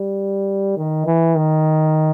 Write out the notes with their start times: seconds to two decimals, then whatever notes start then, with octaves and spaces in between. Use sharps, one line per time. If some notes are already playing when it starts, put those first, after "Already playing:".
Already playing: G3
0.77 D#3
1.07 E3
1.35 D#3